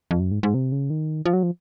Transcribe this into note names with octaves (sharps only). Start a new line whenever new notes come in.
F2
F#2
G#2
G#2
C3
C#3
D#3
F3
F#3
F3